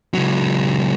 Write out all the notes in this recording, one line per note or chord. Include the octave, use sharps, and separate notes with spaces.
C#2 F#3